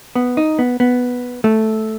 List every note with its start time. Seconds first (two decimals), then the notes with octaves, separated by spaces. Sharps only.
0.15 B3
0.37 D#4
0.59 B3
0.80 B3
1.44 A3